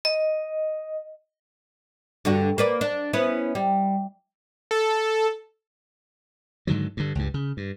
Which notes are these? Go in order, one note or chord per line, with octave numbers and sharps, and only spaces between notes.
D#5
G2 D3 F#4
A#3 B4 D5
D4
B3 C#4 E4
G3
A4
G#2 D3 D#3 F#3
G2 D3
C#2 G2
C#3
G2